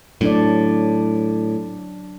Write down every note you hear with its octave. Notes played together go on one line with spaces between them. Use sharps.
A2 F#3 D4 D5